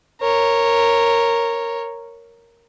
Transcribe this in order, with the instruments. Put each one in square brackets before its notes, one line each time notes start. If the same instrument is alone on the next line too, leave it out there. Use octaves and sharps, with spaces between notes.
[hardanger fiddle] A#4 C#5